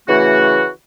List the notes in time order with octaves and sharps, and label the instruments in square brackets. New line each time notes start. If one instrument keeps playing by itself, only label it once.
[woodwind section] C#3 E3 A3 F#4